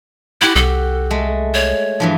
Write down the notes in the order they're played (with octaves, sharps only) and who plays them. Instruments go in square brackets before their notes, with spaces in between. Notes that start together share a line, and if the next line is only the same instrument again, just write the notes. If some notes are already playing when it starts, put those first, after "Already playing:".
[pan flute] E4 [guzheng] F#4 G4 F#5
[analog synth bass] C2 [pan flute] A4
[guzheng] G#3 A3
[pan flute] C#5
[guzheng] G2 E3 F3